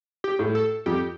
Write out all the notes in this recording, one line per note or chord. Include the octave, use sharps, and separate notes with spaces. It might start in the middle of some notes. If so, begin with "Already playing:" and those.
G4
A2
A4
F2 G4